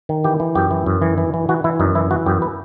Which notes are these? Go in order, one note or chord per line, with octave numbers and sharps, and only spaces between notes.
D#3
E3 G4
E3
F#2 G4
E3
F#2
E3
E3
E3
E3 F#4
E3 E4
F#2 D#4
E3 E4
E3 F#4
F#2 G4
B4